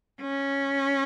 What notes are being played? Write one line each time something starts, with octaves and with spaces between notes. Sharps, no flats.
C#4